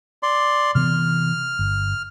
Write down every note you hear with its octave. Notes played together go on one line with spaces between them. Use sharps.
D5 C6
C3 E3 B3 F6
G1